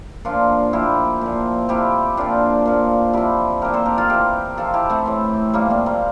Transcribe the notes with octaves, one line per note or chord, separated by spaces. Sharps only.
A#2 F3 D4 F4
A#2 F3 E4 G4
A#2 F3
C3 F3 E4 G4
A#2 F3 D4 F4
A#2 F3
C3 F3 E4 G4
A#2 F3 G4 A#4
A4 C5
G4 A#4
F4 A4
C3 E3 G4 A#4
C3 F3 F4 A4
E4 G4
A3 C4
A2 E3
A#2 F3 G3 A#3
A3 C4
G3 A#3